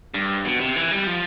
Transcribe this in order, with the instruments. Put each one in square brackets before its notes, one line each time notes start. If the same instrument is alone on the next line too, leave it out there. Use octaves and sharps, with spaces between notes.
[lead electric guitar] G2
B2
C3
E3
G3
F3